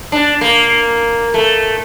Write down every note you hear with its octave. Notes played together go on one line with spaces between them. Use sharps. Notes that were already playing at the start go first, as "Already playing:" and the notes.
D4
A#3
A3